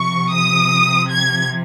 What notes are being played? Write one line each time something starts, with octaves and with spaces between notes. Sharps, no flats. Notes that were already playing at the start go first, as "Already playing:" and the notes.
Already playing: C3 F3 C#6
D#6
G#6